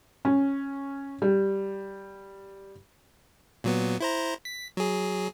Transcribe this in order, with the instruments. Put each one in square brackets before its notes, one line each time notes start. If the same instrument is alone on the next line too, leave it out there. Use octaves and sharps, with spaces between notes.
[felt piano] C#4
G3
[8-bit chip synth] A#2 F#3 B3
E4 C5 A#5
B6
F#3 G#4